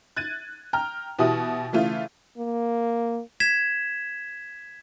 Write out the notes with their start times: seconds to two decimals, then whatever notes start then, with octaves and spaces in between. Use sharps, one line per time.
0.16 F#6 G#6 A6 D#7
0.73 G5 A#5 F6
1.19 B2 E3 E4 F#4 G4 D#6
1.73 C#3 E3 A3 F4
2.37 A#3
3.40 G#6 B6 E7